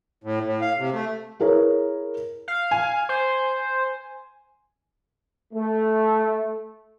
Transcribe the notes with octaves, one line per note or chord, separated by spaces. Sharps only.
A2
A2
F5
C3
A3
E4 G#4 A#4 B4 C#5
F5
G#5
C5
A3